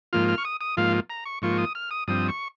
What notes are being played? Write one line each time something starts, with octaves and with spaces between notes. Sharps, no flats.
G#2 F3 A#3 F4 F6
F6
C#6
D#6
D#6
G#2 F3 A#3 F4 F5
A#5
C#6
G#2 F3 A#3 F4 C#6
D#6
F6
D#6
G2 F3 C4 D#6
C#6